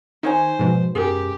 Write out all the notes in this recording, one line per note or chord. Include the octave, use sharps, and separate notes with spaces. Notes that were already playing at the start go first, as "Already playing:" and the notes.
D#3 D#4 C5 C#5 G#5
G#2 B2 F3
F#2 G4 G#4 A#4